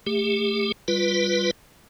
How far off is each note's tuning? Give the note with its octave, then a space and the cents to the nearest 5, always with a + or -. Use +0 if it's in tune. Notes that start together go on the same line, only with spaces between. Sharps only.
A3 +5 G4 +40
G3 +0 F4 +0 B4 +0